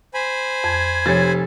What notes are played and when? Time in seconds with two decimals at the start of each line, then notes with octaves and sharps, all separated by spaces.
0.14 C5 G#5 B5
0.64 F2 G#6
1.06 F1 F3 G4 C#5 A6